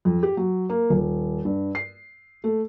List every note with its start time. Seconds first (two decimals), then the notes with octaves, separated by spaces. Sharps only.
0.05 F2
0.23 G4
0.37 F#3
0.70 A#3
0.90 D#1
1.45 G2
1.75 C7
2.44 A3